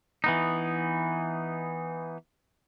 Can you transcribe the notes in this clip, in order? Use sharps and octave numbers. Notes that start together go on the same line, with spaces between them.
E3 B3 D#4